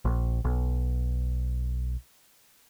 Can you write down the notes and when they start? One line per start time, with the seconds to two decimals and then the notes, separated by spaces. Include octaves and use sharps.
0.05 A#1
0.44 B1